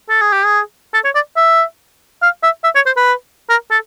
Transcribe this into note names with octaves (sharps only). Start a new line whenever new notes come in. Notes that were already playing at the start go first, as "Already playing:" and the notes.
A4
G#4
G4
G#4
A4
C#5
D5
E5
F5
E5
E5
C#5
C5
B4
A#4
A4